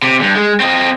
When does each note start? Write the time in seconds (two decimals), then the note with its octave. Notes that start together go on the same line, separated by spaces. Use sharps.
0.02 C3
0.19 E2 G2
0.35 G#3
0.60 C4 D#5